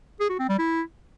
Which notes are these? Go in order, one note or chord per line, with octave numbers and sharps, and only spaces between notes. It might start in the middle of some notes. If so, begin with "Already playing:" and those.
G#4
F#4
C4
G3
E4